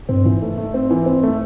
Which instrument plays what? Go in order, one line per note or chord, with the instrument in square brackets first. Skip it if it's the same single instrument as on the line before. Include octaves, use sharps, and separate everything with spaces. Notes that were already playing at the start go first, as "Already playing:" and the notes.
[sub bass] G2 [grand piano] C4
[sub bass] G#2 [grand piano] E3
[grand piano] A3
A3
C4
E3
C4
A3